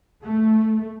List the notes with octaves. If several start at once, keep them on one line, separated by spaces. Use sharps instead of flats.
A3